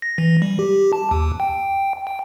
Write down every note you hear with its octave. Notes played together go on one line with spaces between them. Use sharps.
A#6
E3
G3
G4
A5
D#2
G5
G5